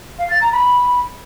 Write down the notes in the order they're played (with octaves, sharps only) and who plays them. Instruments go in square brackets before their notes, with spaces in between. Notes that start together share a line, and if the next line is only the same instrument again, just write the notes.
[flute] F5
A6
A#5
B5